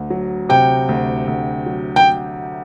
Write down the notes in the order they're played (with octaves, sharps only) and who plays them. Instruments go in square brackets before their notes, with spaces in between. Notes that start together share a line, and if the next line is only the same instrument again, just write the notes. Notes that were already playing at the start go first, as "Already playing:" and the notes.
Already playing: [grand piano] D2
F#3
[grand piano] C3 [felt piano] G5
[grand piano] D2
D2
F#3
[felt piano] G5